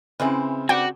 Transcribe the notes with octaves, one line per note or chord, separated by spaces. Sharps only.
C#3 E3 G#3 C4 E4
B3 D4 F#4 G4 G5